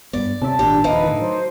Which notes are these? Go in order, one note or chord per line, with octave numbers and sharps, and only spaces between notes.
G2 B3 D5
C3 C#4 E5 A5
G#1 A#2 D4 G4
D#1 C2 F3 A#3 D#4 B4
A2 D3 E3
F#3 C5